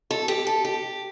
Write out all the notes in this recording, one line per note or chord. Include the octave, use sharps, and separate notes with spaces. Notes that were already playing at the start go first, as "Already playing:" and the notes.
A4
G4
A4
G4